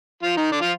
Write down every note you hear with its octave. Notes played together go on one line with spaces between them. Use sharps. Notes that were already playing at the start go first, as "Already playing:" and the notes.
F3 F4
D#3 D#4
D3 D4
F3 F4